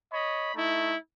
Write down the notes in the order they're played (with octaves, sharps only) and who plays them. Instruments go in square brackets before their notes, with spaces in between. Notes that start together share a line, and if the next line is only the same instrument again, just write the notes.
[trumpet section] C#5 D#5 B5
A3 D#4 E4